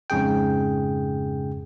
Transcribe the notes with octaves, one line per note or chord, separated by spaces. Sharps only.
F2 G#2 C#3 G#4 G5